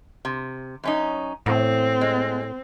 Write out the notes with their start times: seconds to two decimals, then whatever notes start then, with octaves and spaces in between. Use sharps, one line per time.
0.25 C3
0.84 F#2 C#4 D#4
1.46 E2 A2 C4
2.01 G#3